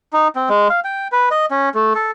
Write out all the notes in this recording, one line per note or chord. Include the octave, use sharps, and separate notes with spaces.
D#4
C4
G#3
F5
G5
B4
D#5
C#4
A3
A4